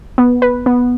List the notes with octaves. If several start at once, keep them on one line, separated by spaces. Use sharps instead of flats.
B3
B4
B3